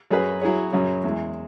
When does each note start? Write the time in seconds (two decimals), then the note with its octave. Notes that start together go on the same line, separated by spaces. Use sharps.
0.10 F#2 F#3 C#4 G#4 B4
0.41 F#3 E4 G#4 C#5
0.73 F#2 C#3 F#3 C#4
1.04 E2 E3 G#3